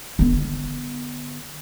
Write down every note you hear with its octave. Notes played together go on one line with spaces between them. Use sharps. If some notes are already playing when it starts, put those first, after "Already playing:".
D3 B3